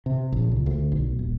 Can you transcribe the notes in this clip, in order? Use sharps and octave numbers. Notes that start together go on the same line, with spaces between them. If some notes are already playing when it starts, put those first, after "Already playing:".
C3
A#1
C#2
D2
B1
D#1